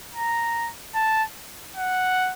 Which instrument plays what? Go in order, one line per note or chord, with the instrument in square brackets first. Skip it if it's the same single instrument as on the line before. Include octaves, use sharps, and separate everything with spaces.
[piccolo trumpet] A#5
A5
F#5